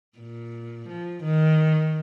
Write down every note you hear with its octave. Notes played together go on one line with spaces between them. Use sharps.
A#2
F3
D#3